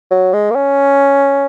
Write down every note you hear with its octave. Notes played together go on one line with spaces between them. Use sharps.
F#3
G#3
A#3
C#4